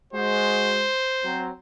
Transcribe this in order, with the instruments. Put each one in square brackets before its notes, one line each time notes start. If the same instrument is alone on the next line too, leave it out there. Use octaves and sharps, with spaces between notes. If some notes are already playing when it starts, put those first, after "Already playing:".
[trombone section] G#3 F#4 [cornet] C5
[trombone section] F#3 C4